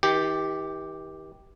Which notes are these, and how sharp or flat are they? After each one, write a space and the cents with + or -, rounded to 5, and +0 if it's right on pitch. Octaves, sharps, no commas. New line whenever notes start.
D#3 +45 G4 +0